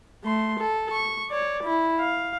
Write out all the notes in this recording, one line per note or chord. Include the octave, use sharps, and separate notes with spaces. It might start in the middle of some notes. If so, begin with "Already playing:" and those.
A3 C6
A4
C#6
C#5 D5
E4
F5